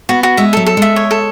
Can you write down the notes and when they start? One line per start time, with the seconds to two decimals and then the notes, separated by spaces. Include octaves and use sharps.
0.09 B3 F#4
0.23 F#4
0.37 G#3 E5
0.53 F#3 A4
0.66 A4
0.77 G#3 E5
0.96 C#5
1.11 A4